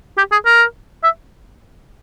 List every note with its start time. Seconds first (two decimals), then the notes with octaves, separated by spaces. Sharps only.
0.17 G4
0.32 G#4
0.46 A#4
1.03 E5